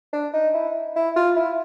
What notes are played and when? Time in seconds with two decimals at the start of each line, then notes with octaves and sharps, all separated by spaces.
0.13 D4
0.34 D#4
0.54 E4
0.96 E4
1.16 F4
1.36 E4